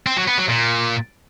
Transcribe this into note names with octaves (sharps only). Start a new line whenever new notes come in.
C4
F#3
B3
F#3
A#2